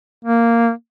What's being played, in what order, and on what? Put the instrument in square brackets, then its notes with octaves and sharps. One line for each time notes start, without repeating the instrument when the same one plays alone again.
[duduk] A#3